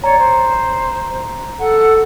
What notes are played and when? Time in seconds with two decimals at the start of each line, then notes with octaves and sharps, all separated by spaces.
0.04 C#5 D5 A#5
0.18 C5
1.59 A4 F#5